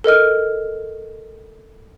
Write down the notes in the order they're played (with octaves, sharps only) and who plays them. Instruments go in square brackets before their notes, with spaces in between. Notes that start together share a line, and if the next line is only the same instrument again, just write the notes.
[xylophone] A4 A#4 D#5 F6